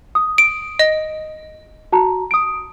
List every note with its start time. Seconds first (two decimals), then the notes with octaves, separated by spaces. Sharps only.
0.15 D#6
0.38 D7
0.79 D#5
1.92 F#4 A5 A#5
2.31 D#6 D7